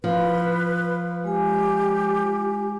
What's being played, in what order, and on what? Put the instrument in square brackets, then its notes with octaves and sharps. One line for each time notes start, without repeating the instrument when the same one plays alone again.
[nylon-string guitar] F3 [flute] B4
[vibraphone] G#3 G#5 [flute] G4